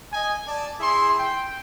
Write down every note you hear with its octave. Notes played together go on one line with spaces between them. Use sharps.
D#5 G#5
D5 A5
E4 G#4 C6
G5